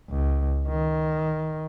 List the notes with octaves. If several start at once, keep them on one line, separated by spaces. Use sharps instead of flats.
C#2
D#3